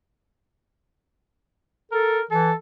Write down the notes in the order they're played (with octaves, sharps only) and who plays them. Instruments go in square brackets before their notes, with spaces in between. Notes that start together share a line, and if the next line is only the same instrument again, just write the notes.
[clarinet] A4 [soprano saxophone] A#4
[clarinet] E3 [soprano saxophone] A4